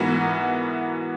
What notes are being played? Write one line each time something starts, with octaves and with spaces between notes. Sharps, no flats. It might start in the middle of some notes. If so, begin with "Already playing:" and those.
Already playing: G#2 E3 B3 F#4 A#4